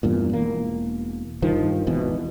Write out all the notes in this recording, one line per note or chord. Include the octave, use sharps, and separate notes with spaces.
E2 G2 A#2
E1 A#3
G2 D#3 F3
G#1 E2 B2 E3